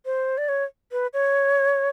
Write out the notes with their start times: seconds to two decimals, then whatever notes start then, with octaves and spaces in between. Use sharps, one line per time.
0.06 C5
0.38 D5
0.49 C#5
0.92 B4
1.14 C#5